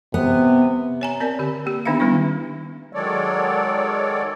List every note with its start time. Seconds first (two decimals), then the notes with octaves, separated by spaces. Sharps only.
0.14 C3 B3
1.01 C#5 G#5 A#5
1.20 C4 A#4 D5
1.39 D3 G4
1.66 A#3 G4
1.86 D#3 B3 D4 D#4 E5 F5
2.00 D#3 G3 B3 C#4 D4 E4
2.93 D#3 F#3 G#3 A4 C#5 D5